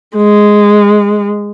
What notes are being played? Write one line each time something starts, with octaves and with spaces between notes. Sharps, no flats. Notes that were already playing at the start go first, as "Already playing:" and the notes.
G#3